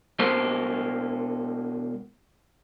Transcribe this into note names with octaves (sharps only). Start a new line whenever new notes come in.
B2 G#3 A4 A#4 C5